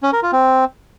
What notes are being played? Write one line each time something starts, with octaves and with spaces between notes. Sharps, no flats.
C#4
A#4
F4
C4